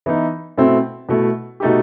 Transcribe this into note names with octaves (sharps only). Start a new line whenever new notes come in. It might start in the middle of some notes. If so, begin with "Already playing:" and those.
E3 B3 D#4
B2 A3 C4 E4
B2 A3 E4
B2 A3 D#4 G4